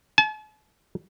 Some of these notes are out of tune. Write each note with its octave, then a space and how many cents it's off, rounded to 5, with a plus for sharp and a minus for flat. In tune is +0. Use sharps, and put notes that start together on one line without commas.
A5 -45